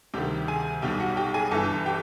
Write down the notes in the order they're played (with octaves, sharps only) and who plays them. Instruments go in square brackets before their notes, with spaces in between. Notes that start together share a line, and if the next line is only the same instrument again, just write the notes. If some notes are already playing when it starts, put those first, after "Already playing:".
[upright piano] D2 C3 D#3 G3 G4 G5
G#4 G#5
B1 B2 G3 G4 G5
F#4 F#5
G4 G5
G#4 G#5
G1 G2 E3 A4 A5
G4 G5